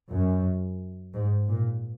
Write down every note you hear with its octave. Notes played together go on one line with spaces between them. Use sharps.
F#2
G#2
A#2